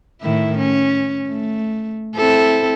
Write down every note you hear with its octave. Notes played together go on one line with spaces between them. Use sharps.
A2 D#3 E4
C#4
A3
C4 E4 A4